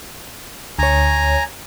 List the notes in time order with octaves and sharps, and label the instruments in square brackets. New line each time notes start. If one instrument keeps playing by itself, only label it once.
[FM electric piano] D2 C#5 [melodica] G#5 A#5